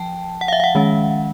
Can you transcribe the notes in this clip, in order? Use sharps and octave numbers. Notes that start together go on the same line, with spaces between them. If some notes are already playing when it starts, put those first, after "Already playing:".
Already playing: F3 G5 A5
F#5
F5
E5
F5
F#5
D#3 G#3 C#4